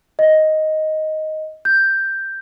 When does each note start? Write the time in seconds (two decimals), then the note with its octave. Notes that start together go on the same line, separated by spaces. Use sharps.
0.19 D#5
1.65 G6